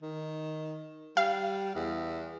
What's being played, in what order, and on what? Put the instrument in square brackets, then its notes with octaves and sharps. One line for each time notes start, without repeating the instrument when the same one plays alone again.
[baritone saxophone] D#3
[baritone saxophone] G3 [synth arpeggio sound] F5
[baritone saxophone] E2